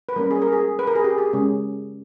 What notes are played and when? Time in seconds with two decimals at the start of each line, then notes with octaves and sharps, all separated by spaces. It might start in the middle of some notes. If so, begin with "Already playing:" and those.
0.09 B4
0.16 G3 A#3 C#4 A#4
0.31 G#4
0.42 A#4
0.53 G#4
0.79 B4
0.87 A#4
0.95 G#4
1.04 G4
1.18 G#4
1.33 C#3 G#3 C#4